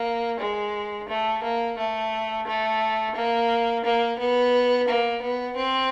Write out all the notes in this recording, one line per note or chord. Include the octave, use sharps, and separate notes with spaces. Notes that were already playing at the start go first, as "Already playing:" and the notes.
Already playing: A#3
G#3
A3
A#3
A3
A3
A#3
A#3
B3
A#3
B3
C4